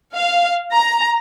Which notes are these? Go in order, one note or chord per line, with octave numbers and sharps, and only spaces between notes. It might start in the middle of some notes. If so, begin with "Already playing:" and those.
F5
A#5